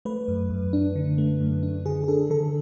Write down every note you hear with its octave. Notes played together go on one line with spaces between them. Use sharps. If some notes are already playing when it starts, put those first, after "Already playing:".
A3 B4
F#2
F#2
D4
D3
A3
F#2
D4
D3 G#4
G#4
D4 A4
D3 A4